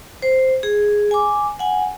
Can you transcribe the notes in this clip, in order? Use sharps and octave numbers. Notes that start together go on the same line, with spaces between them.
C5
G#4
G#5 D6
F#5 G#5